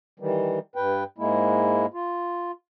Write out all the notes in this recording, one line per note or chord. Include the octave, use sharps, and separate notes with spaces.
D#3 E3 G3
G2 B4 G5
G#2 G#3 A#3 E4
F4